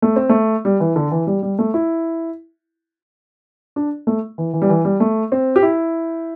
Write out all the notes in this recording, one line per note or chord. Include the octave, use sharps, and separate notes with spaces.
A3
C4
A3
G3
E3
D3
E3
G3
G3
A3
E4
D4
A3
E3
E3
G3
E3
G3
A3
C4
G4
E4